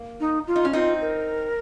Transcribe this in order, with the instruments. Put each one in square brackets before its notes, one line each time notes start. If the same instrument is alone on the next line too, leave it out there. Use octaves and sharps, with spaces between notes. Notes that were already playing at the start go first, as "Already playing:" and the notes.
Already playing: [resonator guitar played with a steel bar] A#3
[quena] D#4
F4
[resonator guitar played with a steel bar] D#4
C#4
[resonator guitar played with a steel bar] C4 D#4 [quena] F4
[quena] A#4